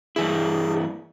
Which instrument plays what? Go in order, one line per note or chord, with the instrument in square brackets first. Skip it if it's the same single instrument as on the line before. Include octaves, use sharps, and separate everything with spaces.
[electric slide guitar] G2 E3 E4 [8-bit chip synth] G#4